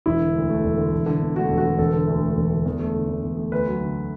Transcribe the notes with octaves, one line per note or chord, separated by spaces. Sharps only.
E1 E4
D3
D2
A3
E1
D3
E1
D3
E2
A3 F#4
E1
F#4
D3
E1 A4
D3
D2
A3
E1
D3
E2
A3
D3
E2
E2
A3
D2 B4
F#3
D3